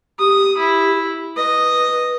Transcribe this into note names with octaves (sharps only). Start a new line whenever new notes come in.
G4 D#6
E4
B4 D#5